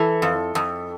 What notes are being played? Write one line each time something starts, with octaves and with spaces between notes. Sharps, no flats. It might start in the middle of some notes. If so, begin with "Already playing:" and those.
Already playing: E3 A4
F2
F2